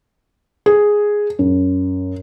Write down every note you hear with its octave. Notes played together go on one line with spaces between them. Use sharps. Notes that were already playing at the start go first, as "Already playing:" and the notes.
G#4
F#2